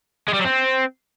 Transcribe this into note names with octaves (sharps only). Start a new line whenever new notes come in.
G#3
G3
F#3
C4